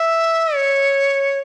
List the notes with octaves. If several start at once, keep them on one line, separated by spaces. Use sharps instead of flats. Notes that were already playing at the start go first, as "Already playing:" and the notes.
Already playing: E5
C#5